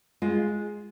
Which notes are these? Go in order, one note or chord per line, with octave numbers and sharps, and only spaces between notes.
G#3 F4